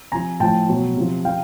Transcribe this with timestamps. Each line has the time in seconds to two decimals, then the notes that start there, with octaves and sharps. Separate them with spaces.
0.12 C3 F3 G#5 A#5
0.40 A2 F3 G5 A5
0.68 B2 F#3
0.96 C3 F3
1.25 C#3 F3 F5 G5